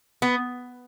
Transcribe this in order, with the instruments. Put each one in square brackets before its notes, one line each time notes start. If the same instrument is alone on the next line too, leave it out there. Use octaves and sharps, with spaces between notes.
[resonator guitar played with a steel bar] B3